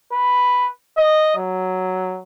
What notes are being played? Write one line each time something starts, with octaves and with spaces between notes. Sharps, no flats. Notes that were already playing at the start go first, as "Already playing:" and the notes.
B4
D#5
F#3